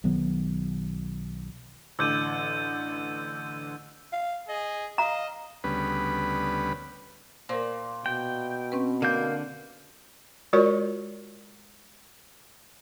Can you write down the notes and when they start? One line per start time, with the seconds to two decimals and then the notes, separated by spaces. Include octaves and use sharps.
0.04 B1 D#3 F#3 B3
1.99 A1 D3 D6 E6 G6 D#7
4.13 F5
4.49 G#4 D#5
4.98 D#5 F5 A#5
5.64 D2 C#3 G3 B3 B4
7.49 A#2 A#4 C5
8.06 B2 G5
8.72 C4 C#4 B4
9.02 D3 A#3 G6
10.53 G#3 F4 F#4 A#4 C#5 D5